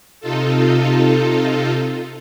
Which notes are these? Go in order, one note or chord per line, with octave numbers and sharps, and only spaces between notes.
C3 D#4 F4 A4